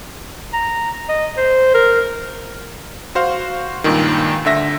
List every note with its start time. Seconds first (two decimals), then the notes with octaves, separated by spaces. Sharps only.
0.53 A#5
1.09 D#5
1.37 C5
1.74 A#4
3.15 F#4 C5 F5
3.84 C#2 G2 A#2 D#3
4.45 D2 D3 E5 A#6